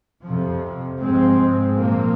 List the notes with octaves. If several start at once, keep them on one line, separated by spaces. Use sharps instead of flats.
F2 C3 F3
G#2 F3 G#3 C4
A#2 F3 A#3